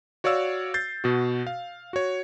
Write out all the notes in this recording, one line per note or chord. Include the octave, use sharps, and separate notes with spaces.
F#4 C#5 D5 F5 E6
G6 A6 C7
B2 F#4
F5
F#4 C#5